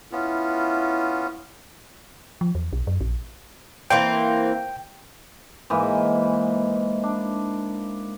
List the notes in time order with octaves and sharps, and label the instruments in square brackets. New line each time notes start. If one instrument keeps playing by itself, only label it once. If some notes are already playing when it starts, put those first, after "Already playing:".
[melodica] B3 C#4 F4 [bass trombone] E4
[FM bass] F3
E2
B1
F#2
A#1
[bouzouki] E3 A#3 C4 [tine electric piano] G5
[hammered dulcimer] G#2 E3 A#3 D#5
D4